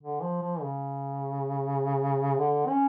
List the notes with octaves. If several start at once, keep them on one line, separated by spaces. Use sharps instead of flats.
D3
F3
F3
C#3
D3
C#4